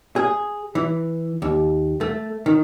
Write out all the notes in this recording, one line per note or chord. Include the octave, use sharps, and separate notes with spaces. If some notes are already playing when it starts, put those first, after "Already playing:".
G#4
E3
D#2
A3
D#3